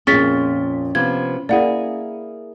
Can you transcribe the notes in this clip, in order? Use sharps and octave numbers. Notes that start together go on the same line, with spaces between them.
F2 A#2 C#4 G#4 A6 B6
C3 F3 B3 G#6
A#3 E4 G#4 D5 F#5